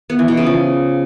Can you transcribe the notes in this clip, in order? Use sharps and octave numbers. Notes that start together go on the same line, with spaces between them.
B3
E3
B2
C#3
F3